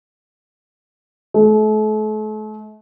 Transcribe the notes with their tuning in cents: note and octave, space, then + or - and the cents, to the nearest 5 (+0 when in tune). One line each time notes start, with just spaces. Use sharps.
A3 -40